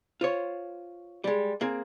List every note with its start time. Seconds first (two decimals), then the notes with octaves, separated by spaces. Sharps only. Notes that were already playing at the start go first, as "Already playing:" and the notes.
0.21 F4 C5 C#5
1.24 G3 G#3
1.61 A#3 C4 G#4